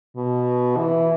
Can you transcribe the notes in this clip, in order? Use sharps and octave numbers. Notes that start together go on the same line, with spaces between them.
B2
E3